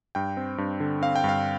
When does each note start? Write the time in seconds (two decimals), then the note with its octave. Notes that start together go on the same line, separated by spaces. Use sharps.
0.15 G2 G5
0.37 C4
0.58 G2
0.80 D3
1.01 C4 F5
1.16 G5
1.24 G2 F5